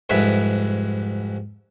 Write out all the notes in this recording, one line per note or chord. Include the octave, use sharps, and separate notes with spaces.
C2 F2 G#2 B4 E5